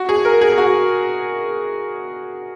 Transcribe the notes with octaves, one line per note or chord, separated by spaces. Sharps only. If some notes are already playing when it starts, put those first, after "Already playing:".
Already playing: F#4
G#4
A#4
G#4
G#4
F#4